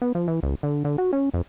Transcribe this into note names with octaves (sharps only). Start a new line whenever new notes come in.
B3
F3
E3
C#2
D3
D3
F#4
C#4
F2